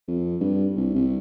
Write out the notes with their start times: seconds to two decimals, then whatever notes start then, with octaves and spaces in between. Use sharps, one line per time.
0.08 F2
0.40 G2
0.76 C2
0.94 C2